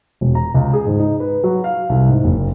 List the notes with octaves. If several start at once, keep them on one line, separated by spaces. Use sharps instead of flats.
E1
A#5
C#2
G#4
G#2
D#4
B4
F#3
F5
C2
G#2
F#1